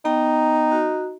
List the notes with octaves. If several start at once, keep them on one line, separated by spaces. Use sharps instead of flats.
B3 D#4 G5 A#5
F#4